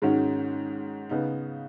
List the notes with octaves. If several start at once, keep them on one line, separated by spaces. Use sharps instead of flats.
G#2 D#3 G#3 C#4 F#4
C#3 B3 D#4